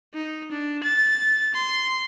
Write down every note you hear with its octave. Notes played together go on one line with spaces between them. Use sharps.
D#4
D4
A6
C6